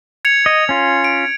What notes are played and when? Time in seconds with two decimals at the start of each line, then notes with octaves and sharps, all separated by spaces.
0.25 G#6 C#7 F7
0.46 D#5
0.69 C#4 F4
1.04 D7